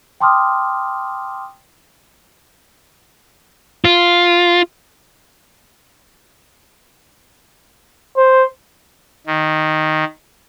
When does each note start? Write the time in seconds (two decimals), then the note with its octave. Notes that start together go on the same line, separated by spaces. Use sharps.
0.20 G5 A5 C6 D6 D#6 F6
3.85 F4
8.16 C5
9.26 D#3